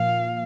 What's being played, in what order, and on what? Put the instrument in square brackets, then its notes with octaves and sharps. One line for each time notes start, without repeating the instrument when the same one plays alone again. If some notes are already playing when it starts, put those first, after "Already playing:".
Already playing: [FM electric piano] A#2 F3 A#3 [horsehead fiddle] F5